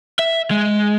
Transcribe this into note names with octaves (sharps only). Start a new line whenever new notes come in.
E5
G#3